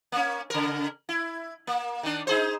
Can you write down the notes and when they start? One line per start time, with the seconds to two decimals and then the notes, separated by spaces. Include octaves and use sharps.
0.12 A#3 C#4
0.50 C#3 A#4
1.09 E4
1.67 A#3
2.03 D#3 D4
2.27 D#4 G#4 C5